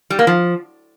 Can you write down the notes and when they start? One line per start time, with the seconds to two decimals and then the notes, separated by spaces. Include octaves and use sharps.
0.10 G3
0.19 A#3
0.27 F3